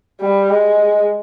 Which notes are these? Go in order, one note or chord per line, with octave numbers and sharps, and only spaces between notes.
G3
G#3